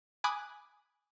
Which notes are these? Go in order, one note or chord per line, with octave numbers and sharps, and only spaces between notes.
G#5 B5 D6 D#6 F#6